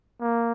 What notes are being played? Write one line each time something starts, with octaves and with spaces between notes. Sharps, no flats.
A#3